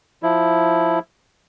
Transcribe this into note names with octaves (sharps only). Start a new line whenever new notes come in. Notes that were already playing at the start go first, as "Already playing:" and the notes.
F3 E4